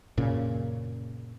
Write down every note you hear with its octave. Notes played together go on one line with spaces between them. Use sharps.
F#2 A#2 C#3